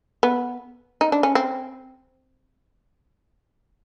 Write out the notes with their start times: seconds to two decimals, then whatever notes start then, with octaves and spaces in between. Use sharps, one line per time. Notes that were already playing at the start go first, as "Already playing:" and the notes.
0.23 B3
1.01 D#4
1.12 D4
1.23 C#4
1.35 C4